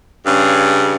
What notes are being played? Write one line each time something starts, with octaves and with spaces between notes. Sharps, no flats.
G2 C#3